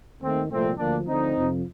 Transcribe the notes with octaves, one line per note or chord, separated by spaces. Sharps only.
D#2 D#3 A3 C4
C2 A#2 F3 A3 C4
D2 D3 F3 A#3 D4
D2 D3 F3 C4 D#4
F2 C3 F3